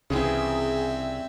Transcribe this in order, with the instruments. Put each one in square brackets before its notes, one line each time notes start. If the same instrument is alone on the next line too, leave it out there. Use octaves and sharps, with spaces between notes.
[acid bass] C2 [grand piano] C#3 E3 [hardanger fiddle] C4 E5 [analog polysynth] G#4